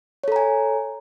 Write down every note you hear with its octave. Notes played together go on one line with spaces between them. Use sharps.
A4 C#5 G#5 A#5